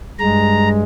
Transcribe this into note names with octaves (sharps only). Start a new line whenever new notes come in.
G2 G#3 A#5